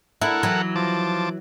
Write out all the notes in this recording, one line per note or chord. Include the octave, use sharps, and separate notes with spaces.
E4 A4 A#4 F#5
E3 F#3
F3 A5 D6